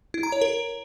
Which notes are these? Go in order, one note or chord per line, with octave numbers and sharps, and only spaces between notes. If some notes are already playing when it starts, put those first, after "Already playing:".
E4
A#5
C#5
A#4